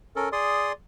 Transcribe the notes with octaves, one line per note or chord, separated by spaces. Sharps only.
C#4 A4 A#4
G#4 D5 C6 D#6